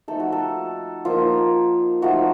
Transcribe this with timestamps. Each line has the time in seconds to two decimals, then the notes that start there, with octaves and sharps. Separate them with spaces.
0.08 F3 A3 D#4 A4
0.20 F#4
0.32 A4
1.05 F3 A#3 D#4 F4
2.02 F3 A3 D#4 F#4